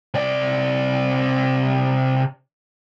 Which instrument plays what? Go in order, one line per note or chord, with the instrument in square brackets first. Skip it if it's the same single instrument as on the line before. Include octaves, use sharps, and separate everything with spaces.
[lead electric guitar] C3 D5